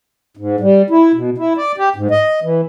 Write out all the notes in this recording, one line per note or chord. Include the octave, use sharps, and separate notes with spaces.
G#2
G3
E4
B2
E4
D5
G4
G#2
D#5
E3